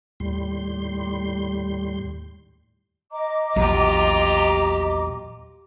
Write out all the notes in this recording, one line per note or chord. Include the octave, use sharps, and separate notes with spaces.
D#2 A2 G3 C6
D#5 A#5 D6
A#1 E2 A#2 F#3 F4 G4